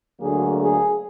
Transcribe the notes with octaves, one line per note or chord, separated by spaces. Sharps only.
D2 D3 F#3 A#3 G#4
G#4